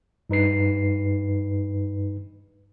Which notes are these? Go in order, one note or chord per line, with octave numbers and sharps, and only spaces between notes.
G2 D#4 B4 C7